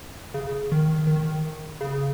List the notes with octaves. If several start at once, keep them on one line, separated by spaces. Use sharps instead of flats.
C#3
D#3
D#3
C#3